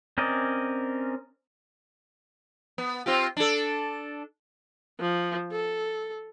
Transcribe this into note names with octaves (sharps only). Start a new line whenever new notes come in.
C4 C#4 A#4 D5 D#5
B3
C4 F4 G4
D4 A4
F3
A4